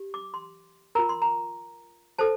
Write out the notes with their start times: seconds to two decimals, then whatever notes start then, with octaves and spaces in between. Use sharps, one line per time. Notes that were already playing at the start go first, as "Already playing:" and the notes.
Already playing: G4
0.14 D6
0.34 C6
0.95 F4 A#4 A#5
1.09 C6
1.22 A#5
2.19 A4 C5 A5